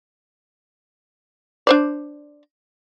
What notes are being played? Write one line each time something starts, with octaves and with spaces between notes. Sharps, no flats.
D4 C5 D5